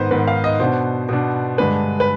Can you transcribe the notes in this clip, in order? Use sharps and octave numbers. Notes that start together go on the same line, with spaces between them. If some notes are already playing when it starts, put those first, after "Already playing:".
Already playing: G#2 D#3 B3 B4 C5
G#2 D#3 B3 B4
F5
D#5
B2 B3 D4 C5
B2 B3 D4
G2 D3 G#3 D4 B4
B4